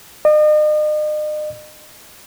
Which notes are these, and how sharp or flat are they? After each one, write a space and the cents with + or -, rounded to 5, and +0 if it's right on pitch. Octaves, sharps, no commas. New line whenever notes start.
D#5 -40